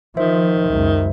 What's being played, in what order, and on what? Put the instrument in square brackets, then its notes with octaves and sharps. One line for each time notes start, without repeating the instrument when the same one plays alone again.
[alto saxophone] D#3 [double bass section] F3 [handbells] C5 E5
[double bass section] C#2 F#2